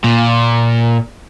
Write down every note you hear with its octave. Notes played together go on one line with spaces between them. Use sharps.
A#2